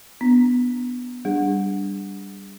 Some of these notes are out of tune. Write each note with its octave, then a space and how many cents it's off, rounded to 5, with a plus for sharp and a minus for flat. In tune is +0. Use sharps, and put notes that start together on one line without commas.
B3 +0 D4 +0
G3 +0 D4 +0 G#4 -20